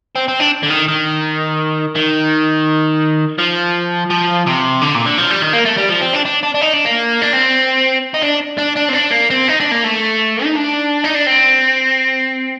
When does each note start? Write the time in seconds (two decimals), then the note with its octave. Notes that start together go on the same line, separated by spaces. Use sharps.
0.15 C4
0.28 C4
0.40 D4
0.63 D3
0.70 D#3
0.88 D#3
1.96 D#3
3.39 F3
4.10 F3
4.46 C3
4.81 D3
4.95 A#2
5.06 D3
5.18 F3
5.30 G3
5.42 D#3
5.53 A#3
5.66 A3
5.78 G3
5.90 F3
6.02 C4
6.14 D4
6.26 D4
6.43 D4
6.55 D4
6.61 D#4
6.74 D4
6.85 A#3
7.21 D4
7.33 C4
8.14 D#4
8.22 D4
8.58 D4
8.77 D4
8.90 C4
8.94 D4
9.12 A#3
9.30 C4
9.48 D#4
9.60 D4
9.71 A#3
9.84 A3
10.44 D#4
10.56 D4
11.04 D#4
11.15 D4
11.27 C4